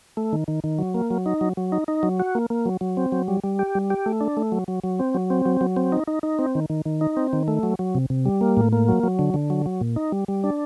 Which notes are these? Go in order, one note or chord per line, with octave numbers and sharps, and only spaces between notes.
A3
D#3
D#3
D#3
F#3
A#3
F#3
D#4
F#3
F#3
D#4
D#4
F#3
F#4
A#3
A#3
F#3
F#3
C4
F#3
G3
G3
G4
G3
G4
A3
D4
A3
F#3
F#3
F#3
C4
F#3
C4
F#3
F#3
C4
D#4
D#4
D#4
C4
D#3
D#3
D#3
D#4
C4
D#3
A3
F#3
F#3
C3
C3
G3
A#3
A2
A#3
F#3
F#3
D3
D3
F#3
F#3
A#2
D#4
G3
G3
D4